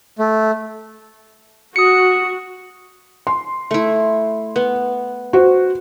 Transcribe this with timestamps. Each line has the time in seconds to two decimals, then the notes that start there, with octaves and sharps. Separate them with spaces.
0.19 A3
1.76 F#4 D#6 C#7
3.27 C6
3.71 A3 E4
4.56 B3
5.33 F#4 C5